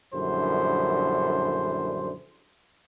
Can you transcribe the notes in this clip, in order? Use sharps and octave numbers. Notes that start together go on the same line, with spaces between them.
A#1 F#2 D3 G3 E4 C5